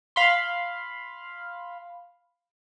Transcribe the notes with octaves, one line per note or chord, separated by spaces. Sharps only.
F5 B5 C6